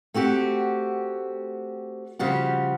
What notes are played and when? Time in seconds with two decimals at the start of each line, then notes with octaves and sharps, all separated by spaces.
0.14 A3 C4 F#4 G4
2.19 C#3 F3 G3 F#4